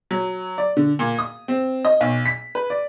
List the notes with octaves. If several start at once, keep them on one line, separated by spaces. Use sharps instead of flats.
F#3
D5
D3
A#2
D#6
C4
D#5
B1
B6
B4
D5